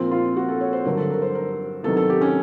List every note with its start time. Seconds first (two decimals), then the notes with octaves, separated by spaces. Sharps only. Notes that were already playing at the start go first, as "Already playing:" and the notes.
Already playing: A#2 F3 C4
0.11 F4
0.36 F#4
0.49 A4
0.61 C#5
0.73 C5
0.85 G2 D3 F#3 A#4
0.97 A4
1.10 A#4
1.22 C5
1.35 A#4
1.84 E2 C3 D#3 F#3 A4
1.97 A4
2.10 G4
2.21 C#4